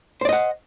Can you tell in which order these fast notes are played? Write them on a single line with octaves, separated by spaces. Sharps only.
C5 D5 D#5 F#5